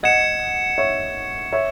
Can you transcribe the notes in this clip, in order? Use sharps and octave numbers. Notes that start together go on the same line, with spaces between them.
D#5 F#5 G#6 C#7 E7
C#5 E5
C#5 E5